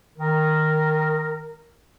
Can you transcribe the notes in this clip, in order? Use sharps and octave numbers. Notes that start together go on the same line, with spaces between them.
D#3 A#4